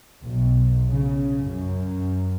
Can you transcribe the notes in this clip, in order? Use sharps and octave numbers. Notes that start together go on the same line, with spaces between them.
B1
C#3
F#2